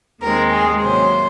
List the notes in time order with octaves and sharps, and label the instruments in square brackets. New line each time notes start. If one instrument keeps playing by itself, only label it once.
[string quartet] D#2 D#3 G#3 C4 A#4
G#4
C3 F#3 A#3 C#4 C5